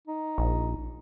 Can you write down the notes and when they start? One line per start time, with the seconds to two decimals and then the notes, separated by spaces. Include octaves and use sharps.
0.08 D#4
0.38 A#1